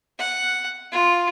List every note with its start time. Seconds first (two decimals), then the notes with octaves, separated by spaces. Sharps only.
0.18 F#5
0.92 F4